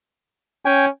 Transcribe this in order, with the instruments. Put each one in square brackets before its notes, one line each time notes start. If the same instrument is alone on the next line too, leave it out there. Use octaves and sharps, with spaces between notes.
[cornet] C#4 [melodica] G5 G#5